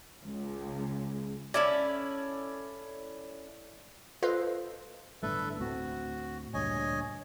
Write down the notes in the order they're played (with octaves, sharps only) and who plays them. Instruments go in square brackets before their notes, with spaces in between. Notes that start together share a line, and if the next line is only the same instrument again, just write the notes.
[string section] C#2
[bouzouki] C#4 E4 A4 [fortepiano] D5
[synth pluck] F4 A4 B4 C5 D#5 F5
[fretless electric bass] G1 A2 D4 [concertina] A4 B4 E5
[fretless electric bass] D2 A2 C4 [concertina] F#4
[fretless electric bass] D2 G2 A#2 [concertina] C#5 D#5 G#5